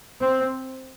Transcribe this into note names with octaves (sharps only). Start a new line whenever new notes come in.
C4